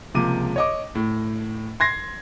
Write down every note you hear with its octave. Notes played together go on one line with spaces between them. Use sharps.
C#2 C3 F3 A#3 D6 D#7
C#5 D#5 D6
A2
C6 G#6 A#6 C7